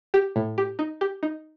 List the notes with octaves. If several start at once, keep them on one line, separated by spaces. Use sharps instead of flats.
G4
A2
G4
D#4
G4
D#4